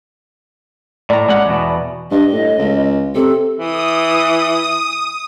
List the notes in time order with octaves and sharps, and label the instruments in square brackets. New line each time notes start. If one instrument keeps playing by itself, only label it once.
[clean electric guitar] A2 [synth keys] D5 A#5
[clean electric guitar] G#3 C#4 F#5
E2 B2
[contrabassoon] G2 [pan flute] D#5
[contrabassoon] A2
C#2
[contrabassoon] C3 [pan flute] A4
[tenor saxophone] E3 [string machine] D#6